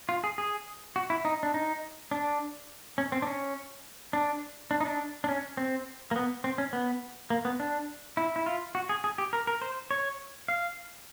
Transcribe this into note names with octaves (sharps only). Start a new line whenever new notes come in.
F4
G#4
G#4
F#4
E4
D#4
D4
D#4
D4
C#4
C4
D4
C#4
D4
D4
D#4
D4
D4
C#4
C4
A#3
B3
C4
C#4
B3
A#3
B3
D4
E4
E4
F4
F#4
G#4
G#4
G4
A#4
A#4
C5
C#5
F5